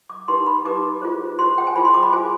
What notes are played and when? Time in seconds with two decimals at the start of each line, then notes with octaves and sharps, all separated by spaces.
0.10 D6
0.28 D#4 G4 B4 C6
0.46 B5
0.65 D#4 G4 B4 D6
1.02 F4 G#4 C5
1.39 F4 G#4 C5 C6
1.58 G5
1.67 G#5
1.76 F4 G#4 C5 B5
1.85 C6
1.94 D6
2.03 B5
2.13 F4 G#4 C5 G#5